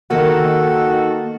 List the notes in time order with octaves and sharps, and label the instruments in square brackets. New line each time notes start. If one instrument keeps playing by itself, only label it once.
[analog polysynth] D#3 A4 [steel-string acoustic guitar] A#3 [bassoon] F#4